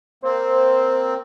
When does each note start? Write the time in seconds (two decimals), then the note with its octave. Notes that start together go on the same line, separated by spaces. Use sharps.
0.24 A#3 C4 C5